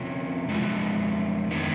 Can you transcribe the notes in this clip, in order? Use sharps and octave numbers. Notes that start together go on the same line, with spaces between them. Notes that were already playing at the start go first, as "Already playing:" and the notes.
Already playing: C3 F3 A#3 C#4
F2 C#3 E3 G#3
D#3 G#3 B3 D#4